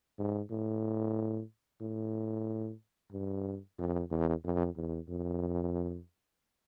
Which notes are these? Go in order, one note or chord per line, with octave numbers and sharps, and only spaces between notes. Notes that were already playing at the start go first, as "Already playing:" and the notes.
G#2
A2
A2
G2
F2
E2
F2
E2
F2